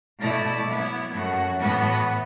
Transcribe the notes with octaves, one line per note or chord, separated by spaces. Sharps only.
B2 A3 E4 D5
F#3 B3 E4
F#2 F#3 A3 F#4
A2 E3 B3 F#4 B4